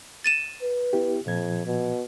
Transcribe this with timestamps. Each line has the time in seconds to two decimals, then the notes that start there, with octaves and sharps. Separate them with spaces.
0.24 A6 D#7 E7
0.62 B4
0.93 B3 E4 G4
1.26 F2 A#2 F3 G#6
1.66 B2